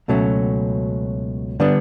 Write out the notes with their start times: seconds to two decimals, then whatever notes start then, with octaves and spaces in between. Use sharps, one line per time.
0.08 C#2 B2 F#3 A3 C#4
1.60 D3 G3 B3 D4